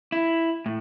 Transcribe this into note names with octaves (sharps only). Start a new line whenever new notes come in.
E4
A2